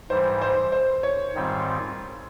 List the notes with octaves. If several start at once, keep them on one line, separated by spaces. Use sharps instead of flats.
G#2 E3 G3 C5
C5
C5
C#5
G#2 D#3 G3 C4 F4